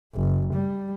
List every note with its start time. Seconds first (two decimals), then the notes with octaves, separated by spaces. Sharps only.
0.15 F#1
0.54 G3